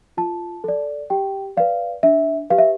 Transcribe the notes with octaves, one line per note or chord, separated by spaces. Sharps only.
F4 A5
A4 D5
G4 G5
B4 D5 F5
D4 E5
G4 B4 F5
E5